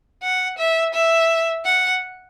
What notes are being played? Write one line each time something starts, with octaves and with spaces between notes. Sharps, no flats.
F#5
E5
E5
F#5